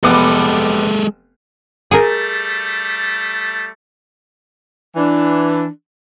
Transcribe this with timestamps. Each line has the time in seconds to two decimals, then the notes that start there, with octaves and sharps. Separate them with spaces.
0.03 F1 G#3 B3 A4 D6
1.91 G3 A3 G#4 A#4
4.96 E3 D4